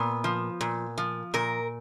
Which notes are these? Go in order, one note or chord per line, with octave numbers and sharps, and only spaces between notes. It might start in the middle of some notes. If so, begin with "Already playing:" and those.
Already playing: A#2 B3
F3
A#2
F3
A#2 A#4